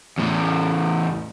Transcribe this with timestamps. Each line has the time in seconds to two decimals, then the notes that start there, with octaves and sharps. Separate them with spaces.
0.18 E2 A2